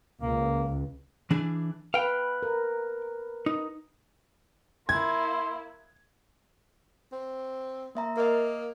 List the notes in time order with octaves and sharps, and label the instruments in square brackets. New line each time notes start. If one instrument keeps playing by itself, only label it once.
[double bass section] C#2 [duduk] A#3
[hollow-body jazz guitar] E3 D4 G#4
[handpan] B4 [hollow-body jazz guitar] F5 G5
[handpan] A#4
[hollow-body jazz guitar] D#4
[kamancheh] A#3 E4 [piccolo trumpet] C6 [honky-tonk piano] G#6
[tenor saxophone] C4
[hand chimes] A#3 E5 A#5
[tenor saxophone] A#3 [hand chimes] A#4 D#5